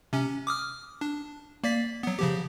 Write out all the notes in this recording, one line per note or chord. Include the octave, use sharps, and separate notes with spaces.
C3 C#4
D6 D#6 F6
D4
A#3 D5 B6
F#3 B3
C#3 F3 G4